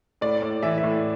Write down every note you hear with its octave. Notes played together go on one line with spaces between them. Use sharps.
A2 D5
A2
E3 E5
E5
A2